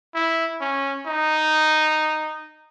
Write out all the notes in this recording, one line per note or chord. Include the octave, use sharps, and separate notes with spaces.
E4
C#4
D#4